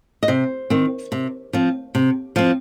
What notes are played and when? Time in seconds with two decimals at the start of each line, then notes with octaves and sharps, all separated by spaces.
0.23 D#5
0.28 C3 C5
0.70 D#3 C4
1.12 C3
1.53 F3 C4
1.95 C3
2.36 F3 C4